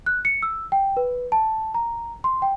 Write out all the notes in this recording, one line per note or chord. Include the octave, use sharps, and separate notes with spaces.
F#6
C#7
E6
G5
B4
A5
A#5
C6
G5